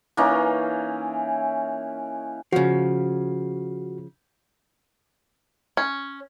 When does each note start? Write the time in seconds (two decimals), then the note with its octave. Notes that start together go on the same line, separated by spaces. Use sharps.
0.17 E3 A#3 C#4 D#4
2.52 C#3 F3 F#4
5.77 C#4